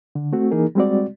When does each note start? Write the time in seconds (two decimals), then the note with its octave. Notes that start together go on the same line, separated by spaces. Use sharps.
0.15 D3
0.33 A3 C4 F#4
0.51 E3 A#3 D#4 G#4 A#4
0.75 G3 G#3 C4 F#4 D5